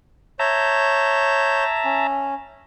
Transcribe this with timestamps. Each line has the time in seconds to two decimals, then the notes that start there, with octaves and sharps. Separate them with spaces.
0.40 C#5 E5 A5 A#5 G6
1.85 C#4